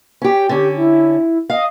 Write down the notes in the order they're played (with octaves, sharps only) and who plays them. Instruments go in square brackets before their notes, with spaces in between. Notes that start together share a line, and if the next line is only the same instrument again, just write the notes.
[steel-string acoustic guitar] C#4 G4
[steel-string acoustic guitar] D3 C#4 [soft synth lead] G4
[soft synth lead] E4
[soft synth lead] D#5 [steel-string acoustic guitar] F5